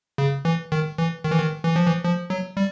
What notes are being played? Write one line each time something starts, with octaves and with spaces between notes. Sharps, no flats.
C#3
E3
D#3
E3
D#3
E3
D#3
E3
F3
E3
F3
F#3
G3